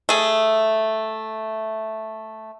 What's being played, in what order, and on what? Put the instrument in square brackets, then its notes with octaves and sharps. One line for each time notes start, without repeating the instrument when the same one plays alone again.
[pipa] A3 G#4